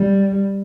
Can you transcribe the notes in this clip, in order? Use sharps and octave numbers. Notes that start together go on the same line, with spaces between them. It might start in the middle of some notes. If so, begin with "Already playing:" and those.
Already playing: G3